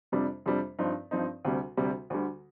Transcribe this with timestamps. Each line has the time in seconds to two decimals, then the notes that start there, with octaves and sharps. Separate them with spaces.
0.12 F2 C3 G3 D4
0.46 F2 C3 G3 D4
0.79 G2 F3 C4 D#4
1.11 G2 F3 C4 D#4
1.45 D2 C3 G3
1.77 D2 C3 G3
2.10 D2 D3 G3